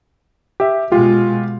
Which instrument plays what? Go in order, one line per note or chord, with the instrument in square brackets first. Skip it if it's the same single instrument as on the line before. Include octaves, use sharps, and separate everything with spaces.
[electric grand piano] G4 E5
[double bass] B2 G#3 [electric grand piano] F4 G4